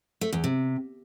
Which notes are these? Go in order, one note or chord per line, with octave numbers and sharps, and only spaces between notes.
A3
E2
C3